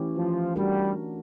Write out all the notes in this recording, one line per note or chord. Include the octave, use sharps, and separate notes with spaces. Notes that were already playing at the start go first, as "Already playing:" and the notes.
Already playing: E3 A3 C#4 E4 G4
F3
G3 A3 D4 F#4 A#4